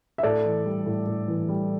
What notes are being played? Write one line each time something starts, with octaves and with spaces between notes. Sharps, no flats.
E5
A2 A4 D5
E3
G3
A2
A2
E3
G3